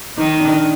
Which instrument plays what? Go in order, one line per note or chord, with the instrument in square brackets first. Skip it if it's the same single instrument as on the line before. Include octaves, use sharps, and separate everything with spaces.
[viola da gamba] D#3 [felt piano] D#4
[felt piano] D4